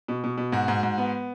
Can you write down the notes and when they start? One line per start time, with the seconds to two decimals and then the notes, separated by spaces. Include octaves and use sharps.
0.08 B2
0.24 B2
0.37 B2
0.52 G#2 F#4
0.68 G#2
0.83 G#2
0.98 B3